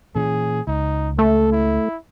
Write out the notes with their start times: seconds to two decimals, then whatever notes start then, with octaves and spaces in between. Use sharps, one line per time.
0.15 A#2 E3 C#4 G#4
0.67 C#2 D#4
1.19 A3 A4
1.52 E4